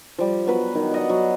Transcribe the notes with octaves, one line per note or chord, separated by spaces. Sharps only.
F3 G3
F#3 B3 B4
D#3 D#5
D5 D#5 F#5
F#3